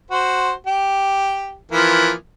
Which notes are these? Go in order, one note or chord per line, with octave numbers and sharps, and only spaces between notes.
F#4 C5
G4
E3 F3 A#3